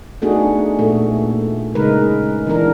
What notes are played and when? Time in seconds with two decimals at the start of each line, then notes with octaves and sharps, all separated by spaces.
0.22 A3 B3 D4 D#4 F#4 G#4
0.79 A#2 A3
1.75 C#3 G#3 D#4 A#4 B4
2.47 E3 B3 D4 A#4